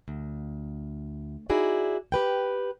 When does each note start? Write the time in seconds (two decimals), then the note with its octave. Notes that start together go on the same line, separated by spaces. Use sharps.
0.08 D2
1.50 D#4 E4 F#4 G#4 D5
2.12 G4 B4 G5